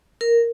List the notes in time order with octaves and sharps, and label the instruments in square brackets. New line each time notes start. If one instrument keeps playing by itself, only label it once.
[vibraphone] A#4